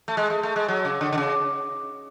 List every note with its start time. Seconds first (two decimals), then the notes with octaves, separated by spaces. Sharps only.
0.08 A3
0.17 G#3
0.30 A3
0.43 A3
0.56 G#3
0.68 F#3
0.85 C#3
1.01 D3
1.13 D3
1.18 C#3